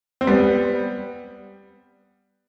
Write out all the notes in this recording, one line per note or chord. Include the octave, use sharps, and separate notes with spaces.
C4
G3 B3